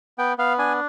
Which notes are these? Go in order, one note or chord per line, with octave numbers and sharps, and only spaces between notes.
B3 G5
B3 F5
D4 G#5